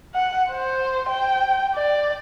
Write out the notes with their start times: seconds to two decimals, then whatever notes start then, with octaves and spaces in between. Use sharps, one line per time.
0.14 F#5
0.51 C5
1.09 G5
1.74 D5